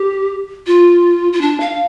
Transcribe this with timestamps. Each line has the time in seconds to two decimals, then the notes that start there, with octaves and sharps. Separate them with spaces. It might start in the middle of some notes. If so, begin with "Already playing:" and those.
Already playing: G4
0.67 F4
1.33 F4
1.41 D4
1.60 F5